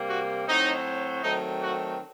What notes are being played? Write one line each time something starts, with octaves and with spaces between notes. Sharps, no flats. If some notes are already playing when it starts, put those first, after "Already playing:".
Already playing: C3 G3 A#3
F#4
A2 F#3 C4 D#4
D#3 F#3 A3 C4 D#4
F#4